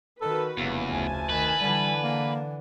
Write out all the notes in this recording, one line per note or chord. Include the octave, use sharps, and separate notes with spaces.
D#3 F#4 A4 B4
F1 E2 C#3 A#3
D2 E4 G#5 A5
D#3 B4
D3 E3 G3
A#3